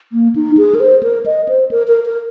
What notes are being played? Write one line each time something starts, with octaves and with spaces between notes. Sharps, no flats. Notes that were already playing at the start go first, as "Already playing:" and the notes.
A#3
D#4
G#4
A#4
C5
A#4
D#5
C5
A#4
A#4
A#4